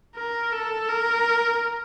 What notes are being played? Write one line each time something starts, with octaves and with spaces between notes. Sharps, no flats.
A#4
A4
A#4